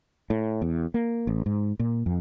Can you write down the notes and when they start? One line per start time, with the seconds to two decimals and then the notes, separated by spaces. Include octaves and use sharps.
0.30 A2
0.62 E2
0.94 A#3
1.27 A1
1.46 G#2
1.79 A#2
2.06 F2